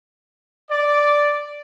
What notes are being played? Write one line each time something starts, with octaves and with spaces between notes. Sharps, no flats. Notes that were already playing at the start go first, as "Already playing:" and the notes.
D5